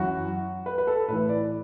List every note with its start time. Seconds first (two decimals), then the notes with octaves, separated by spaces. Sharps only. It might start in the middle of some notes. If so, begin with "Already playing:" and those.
Already playing: F#2 E3 F#4
0.66 B4
0.78 B4
0.87 A4
1.08 A2 E3 B4
1.29 D5